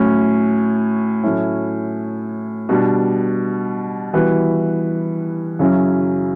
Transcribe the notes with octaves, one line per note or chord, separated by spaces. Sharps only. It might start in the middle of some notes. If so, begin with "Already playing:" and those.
Already playing: A2 F#3 C#4
A2 F#3 A3 C#4 E4
B2 G3 D4
E3 G3 B3 F#4 B4
F#2 C#3 F#3 C#4 E4